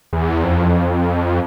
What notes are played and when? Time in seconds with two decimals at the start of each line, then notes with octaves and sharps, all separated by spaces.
0.13 E2
0.44 F2